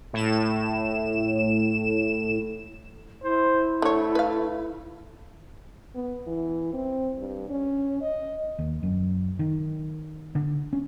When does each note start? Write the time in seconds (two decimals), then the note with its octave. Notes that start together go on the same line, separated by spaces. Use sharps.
0.13 A2 E7
3.23 E4 C5
3.82 D3 A3 C#5
4.15 B4 F5
5.95 B3
6.27 E3
6.73 C4
7.18 G2
7.49 C#4
8.02 D#5
8.59 D#2
8.83 F#2
9.39 D#3
10.35 D3
10.73 C#4